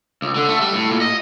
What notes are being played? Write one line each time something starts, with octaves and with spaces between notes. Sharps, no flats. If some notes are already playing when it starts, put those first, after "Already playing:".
C#2
D3
A3
G3
A2
A#2
D#5